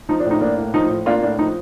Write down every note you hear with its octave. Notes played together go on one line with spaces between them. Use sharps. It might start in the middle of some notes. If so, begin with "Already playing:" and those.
F3 D#4
D4
A2
D#4
A#3 D4
A2
F3 D#4
A2
A#3 D4 F4
A2 D4
F3 D#4